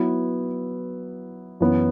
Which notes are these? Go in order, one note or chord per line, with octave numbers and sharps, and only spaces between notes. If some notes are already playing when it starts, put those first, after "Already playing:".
Already playing: F#3 B3 E4 B4
F#2 E3 B3